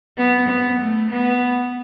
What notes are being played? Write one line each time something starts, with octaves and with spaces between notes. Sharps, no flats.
B3
B3
A3
B3